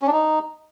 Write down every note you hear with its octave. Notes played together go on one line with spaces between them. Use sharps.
C#4
D4
D#4